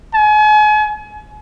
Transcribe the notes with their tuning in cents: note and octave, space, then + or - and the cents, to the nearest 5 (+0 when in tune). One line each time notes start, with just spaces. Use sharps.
G#5 +40